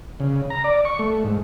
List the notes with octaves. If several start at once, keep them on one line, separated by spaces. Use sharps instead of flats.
C#3
A#5
D5
C#6
A3
G#2